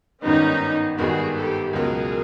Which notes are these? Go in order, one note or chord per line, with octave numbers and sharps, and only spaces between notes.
G#1 G2 D#3 G3 B3 C#4 D#4
G#1 G2 D#3 G3 B3 F#4 G#4
G4 A4
C#2 B2 F#3 A#3 G#4 A#4